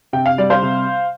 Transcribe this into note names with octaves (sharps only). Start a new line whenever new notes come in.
C3 G5
F5
G3 D5
C5 F5
C3